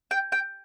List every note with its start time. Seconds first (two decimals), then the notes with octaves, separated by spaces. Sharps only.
0.11 G5
0.32 G5